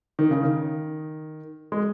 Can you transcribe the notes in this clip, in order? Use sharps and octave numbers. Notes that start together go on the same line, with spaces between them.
D#3
C#3
D#3
G#3